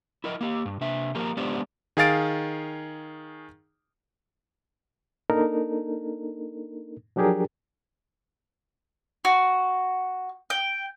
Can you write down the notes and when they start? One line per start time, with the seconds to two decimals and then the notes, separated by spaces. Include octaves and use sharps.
0.24 E4 A#4 D#5
0.41 A#3 G4
0.65 G2
0.81 C3 D4 E5
1.15 F3 A#3 G4 A#4
1.37 G#3 B3 D4 G4 C5 D5
1.97 D#3 G#4 F5 A6 D7
5.30 A#3 D4 D#4 A4 A#4
7.16 F3 F#3 D4 G4 G#4 A#4
9.25 F#4
10.50 G5